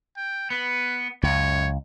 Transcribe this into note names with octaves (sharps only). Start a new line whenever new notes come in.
G5
B3 B4
C#2 F#2 C#5